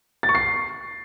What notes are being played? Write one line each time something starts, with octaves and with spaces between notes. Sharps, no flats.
A6
C#6
C7